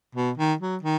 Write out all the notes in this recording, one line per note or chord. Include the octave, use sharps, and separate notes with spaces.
B2
D#3
F#3
D#3